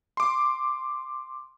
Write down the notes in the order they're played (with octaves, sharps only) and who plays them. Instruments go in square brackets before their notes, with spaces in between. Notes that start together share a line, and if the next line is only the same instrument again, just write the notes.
[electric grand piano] C6 D6